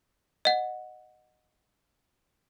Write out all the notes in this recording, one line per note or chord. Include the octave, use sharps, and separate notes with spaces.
D#5 F#5